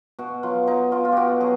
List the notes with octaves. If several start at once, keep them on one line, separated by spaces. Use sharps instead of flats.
B2 F#4
F#3 F4
F#3 D#4
B2 F4
F4
B2 F#4 G4
F#3 G#4